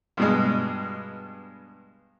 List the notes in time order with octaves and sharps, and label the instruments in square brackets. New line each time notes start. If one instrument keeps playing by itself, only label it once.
[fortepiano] G2 B2 G#3